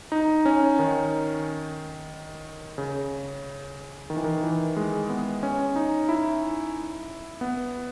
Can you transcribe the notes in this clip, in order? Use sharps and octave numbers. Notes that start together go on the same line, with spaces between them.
D#4
C#4
D#3
C#3
D#3
E3
D#3
E3
G#3
B3
C#4
D#4
E4
B3